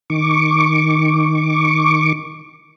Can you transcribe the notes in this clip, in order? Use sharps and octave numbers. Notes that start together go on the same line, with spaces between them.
D#3 C#6 D6